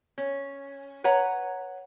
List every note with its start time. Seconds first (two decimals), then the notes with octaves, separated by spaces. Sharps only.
0.18 C#4
1.04 B4 C#5 F#5 A#5